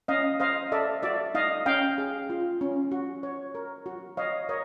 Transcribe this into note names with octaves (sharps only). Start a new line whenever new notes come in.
C#4 D#5 F5
C5 D#5 F5
A4 D5 E5
F#4 D5 E5
D#4 D#5 F5
C#4 F5 G5
G#4
F4
C#4
F#4
C#5
A#4
F#4
C#5 D#5 F5
A#4 C#5 D#5